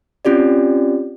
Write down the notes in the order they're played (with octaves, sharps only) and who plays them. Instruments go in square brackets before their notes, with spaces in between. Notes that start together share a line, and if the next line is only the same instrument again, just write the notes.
[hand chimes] C4 C#4 F4 G4 D5